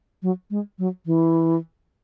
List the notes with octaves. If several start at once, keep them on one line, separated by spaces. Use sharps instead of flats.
F#3
G#3
F#3
E3